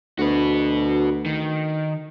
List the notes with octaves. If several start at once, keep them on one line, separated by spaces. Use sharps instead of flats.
D2 F#4 B4
D#3